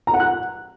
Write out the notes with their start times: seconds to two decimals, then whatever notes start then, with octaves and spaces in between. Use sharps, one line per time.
0.07 A#5
0.14 F#5
0.20 F#6